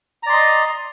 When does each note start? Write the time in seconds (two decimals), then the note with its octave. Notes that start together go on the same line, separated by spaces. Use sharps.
0.23 A#5
0.26 D5
0.29 C6
0.33 D#5